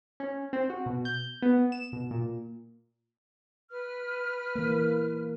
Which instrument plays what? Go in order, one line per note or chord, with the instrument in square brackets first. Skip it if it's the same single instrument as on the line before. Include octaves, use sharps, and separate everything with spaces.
[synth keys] C#4
C4
F#4
B2
G6
B3
E7
B2
A#2
[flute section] B4 F6
[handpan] E3 A#3